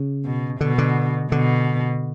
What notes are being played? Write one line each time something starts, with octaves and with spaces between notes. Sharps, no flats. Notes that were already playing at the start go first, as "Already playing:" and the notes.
Already playing: C#3
B2
B2 D3
D3
B2 D3